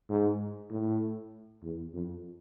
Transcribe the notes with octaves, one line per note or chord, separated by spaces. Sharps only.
G#2
A2
E2
F2